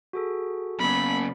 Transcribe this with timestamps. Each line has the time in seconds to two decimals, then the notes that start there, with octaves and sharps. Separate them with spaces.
0.13 F#4 G#4 A4
0.80 F#2 C#3 A#3 B3 B5